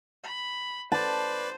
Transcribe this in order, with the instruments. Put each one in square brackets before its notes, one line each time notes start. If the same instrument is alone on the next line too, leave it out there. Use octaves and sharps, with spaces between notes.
[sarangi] B5
[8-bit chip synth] B4 D5 [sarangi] C5 [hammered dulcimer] A5